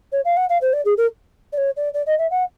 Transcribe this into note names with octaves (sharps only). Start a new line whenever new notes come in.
C#5
F5
F#5
F5
C5
D5
G#4
A#4
D5
C#5
D5
D5
D#5
E5
F#5